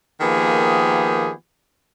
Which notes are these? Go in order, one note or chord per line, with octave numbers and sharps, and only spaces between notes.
D#3 F3 A#3 B3 G4 G#4